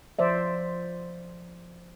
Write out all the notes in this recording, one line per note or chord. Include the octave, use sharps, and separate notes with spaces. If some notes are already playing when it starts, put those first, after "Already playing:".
F3 C5 D5 E5